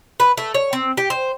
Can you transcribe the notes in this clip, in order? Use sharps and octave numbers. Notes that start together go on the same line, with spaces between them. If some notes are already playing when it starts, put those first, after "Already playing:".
B4
A3
C#5
C4
G4
C5